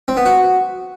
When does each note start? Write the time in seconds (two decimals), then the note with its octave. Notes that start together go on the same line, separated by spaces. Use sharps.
0.08 C4
0.17 B3
0.25 F#4